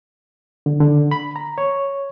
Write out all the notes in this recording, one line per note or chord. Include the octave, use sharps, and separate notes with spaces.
D3
D3
B5
A#5
C#5